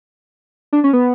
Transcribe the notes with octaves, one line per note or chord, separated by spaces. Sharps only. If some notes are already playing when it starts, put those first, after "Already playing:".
D4
C#4
B3